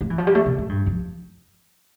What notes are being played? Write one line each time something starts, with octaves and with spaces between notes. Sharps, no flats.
A3
E3
F3
G3
A3
B2
A2
G2
F2